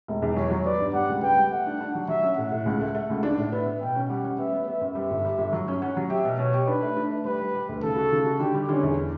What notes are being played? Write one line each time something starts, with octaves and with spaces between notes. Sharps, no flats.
E1
E2
F#3 C#5
F#3
B3 D5
G2
G3 F#5
C#2
B3 G5
G3
A3 F#5
D4
D4
F#3
F#3 E5
C#4
A2 F#5
A2
C#2
A3
A3
C#2
D4
A2
B3 E5
B3
B2 G5
C#4
G3 F#5
C#4
B3 E5
B3
B3 E5
F#2
G3 E5
G1
G3
G1
F#3
C#4
C#4 F#5
F#3
G4 E5
B2
B2 C#5
G4
D4 B4
A3
D4
A3
G3 B4
G3
G3
D2
C#3 A4
F#4
C#3
F#4
D3 G4
G3
D3 C#4
E2